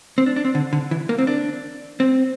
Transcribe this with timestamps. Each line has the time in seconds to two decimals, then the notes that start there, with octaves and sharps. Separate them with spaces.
0.18 C4
0.26 D4
0.36 D4
0.45 C4
0.55 D3
0.73 D3
0.91 E3
1.09 A#3
1.19 C4
1.27 D4
2.00 C4